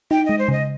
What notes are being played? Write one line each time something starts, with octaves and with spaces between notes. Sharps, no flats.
D#4 G5
G#3 D#5
C5
C#3 D#5